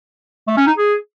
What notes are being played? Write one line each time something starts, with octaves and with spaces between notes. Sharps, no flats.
A3
C#4
D#4
G#4